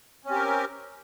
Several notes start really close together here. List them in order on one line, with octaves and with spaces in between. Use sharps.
C#4 C4 G4 A#4